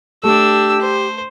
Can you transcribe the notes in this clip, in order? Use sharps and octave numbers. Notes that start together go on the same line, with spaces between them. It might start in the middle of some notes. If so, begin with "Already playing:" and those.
A3 D4 G4 E6
C5